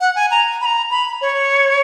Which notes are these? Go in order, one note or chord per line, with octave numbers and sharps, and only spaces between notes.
F#5
G#5
A#5
B5
A#5
B5
C#5